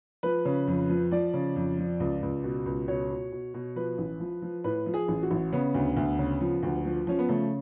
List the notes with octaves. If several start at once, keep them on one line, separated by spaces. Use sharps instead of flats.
F3 B4
C#3
F2
F3
F3 D5
C#3
F2
F3
C#2
C#2
B2
C#2
B2 C#5
B2
B2
B2
F3 B4
A1
F3
F3
A2 B4
F3
G#4
A1
F#4
A1
C#3 B3
D2
D2
C#3
F3
D2
F3
F3 C#4
B3
C#3 A3